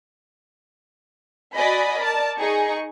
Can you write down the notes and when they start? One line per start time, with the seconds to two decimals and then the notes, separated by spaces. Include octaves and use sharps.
1.56 F#4 D5 D#5 G#5 B5
1.99 A#4 D5 A5
2.39 D#4 G#4 C#6